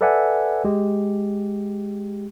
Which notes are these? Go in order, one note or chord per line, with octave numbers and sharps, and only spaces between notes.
A4 B4 D5 E5 F#5 G#5
G#3 G4